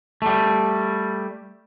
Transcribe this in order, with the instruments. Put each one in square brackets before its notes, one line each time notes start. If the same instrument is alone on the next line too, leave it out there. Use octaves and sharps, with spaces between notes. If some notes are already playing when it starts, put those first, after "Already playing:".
[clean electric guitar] G3 A3